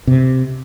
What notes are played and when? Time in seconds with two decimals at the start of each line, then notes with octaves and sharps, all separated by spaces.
0.07 C3